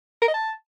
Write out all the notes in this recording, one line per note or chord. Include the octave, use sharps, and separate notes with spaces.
A#4
D#5
A5